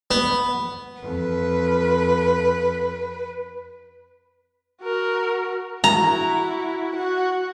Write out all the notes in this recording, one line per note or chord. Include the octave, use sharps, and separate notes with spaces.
B3
F2 B4
F#4 A#4
E4 F#4 A#5
F#4 F#5